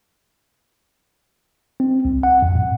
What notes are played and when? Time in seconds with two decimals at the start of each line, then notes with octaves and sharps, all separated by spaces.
1.80 C4
2.05 C2
2.23 F#5
2.42 F2
2.55 A2